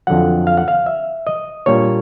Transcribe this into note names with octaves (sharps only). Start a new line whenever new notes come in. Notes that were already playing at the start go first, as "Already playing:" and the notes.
F2 D3 F#3 F#5
F5
F#5
F5
E5
D#5
A#2 G3 A#3 D4 C#5